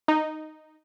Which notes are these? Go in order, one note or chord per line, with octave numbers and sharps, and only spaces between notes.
D#4